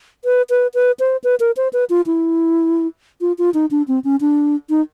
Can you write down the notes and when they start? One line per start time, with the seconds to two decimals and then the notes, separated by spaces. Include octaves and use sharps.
0.25 B4
0.50 B4
0.74 B4
1.00 C5
1.24 B4
1.40 A#4
1.57 C5
1.73 B4
1.90 F4
2.06 E4
3.21 F4
3.38 F4
3.54 D#4
3.71 D4
3.88 C4
4.04 C#4
4.21 D4
4.70 D#4